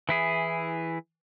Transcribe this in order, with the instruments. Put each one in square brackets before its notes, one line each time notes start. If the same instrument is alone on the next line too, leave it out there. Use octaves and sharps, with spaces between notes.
[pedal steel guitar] E3 E4 G#4